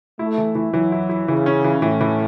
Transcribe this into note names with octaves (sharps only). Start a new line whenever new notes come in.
A3 E4
E3
E3
E3 F#3
E4
E4
C#3 E3
C#4
E3
A2 E3
E3